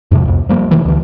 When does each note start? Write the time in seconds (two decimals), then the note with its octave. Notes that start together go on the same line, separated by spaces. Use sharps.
0.11 F2 G#2 C3 F3
0.25 C2 F2
0.49 F3 G3 A#3
0.71 C3 D#3 E3 A3
0.85 D2 E3